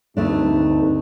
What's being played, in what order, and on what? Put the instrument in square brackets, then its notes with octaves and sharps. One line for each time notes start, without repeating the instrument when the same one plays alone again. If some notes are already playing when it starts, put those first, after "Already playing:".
[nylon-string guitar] D2 A3 D4 [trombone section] G2 C4 D#4